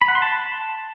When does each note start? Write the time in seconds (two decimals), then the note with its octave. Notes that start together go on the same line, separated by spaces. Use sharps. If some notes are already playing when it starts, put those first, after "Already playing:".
0.01 B5
0.08 F#5
0.15 C6
0.22 A5